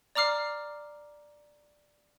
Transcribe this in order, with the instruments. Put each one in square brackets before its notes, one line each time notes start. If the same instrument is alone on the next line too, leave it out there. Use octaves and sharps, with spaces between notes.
[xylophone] D5 A#5 D6 F6 C7